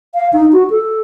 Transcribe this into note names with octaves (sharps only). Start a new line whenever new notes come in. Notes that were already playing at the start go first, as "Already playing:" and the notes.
F5
D#4
F#4
A4